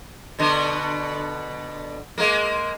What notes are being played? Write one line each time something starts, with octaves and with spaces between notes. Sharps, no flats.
B2 D3 B3
G#3 A#3